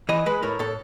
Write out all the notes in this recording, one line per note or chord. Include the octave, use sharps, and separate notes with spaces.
E3 D#5
G#3 B4
A2 A#4
A2 A4